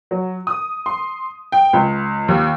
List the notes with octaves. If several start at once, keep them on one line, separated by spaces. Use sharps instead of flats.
F#3
D#6
C6
G5
C#2
D#2